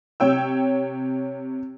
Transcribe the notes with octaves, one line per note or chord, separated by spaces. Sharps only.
C3 C#5 G5 E6